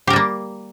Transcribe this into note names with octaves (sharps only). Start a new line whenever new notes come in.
G3 A#3 G4 A#4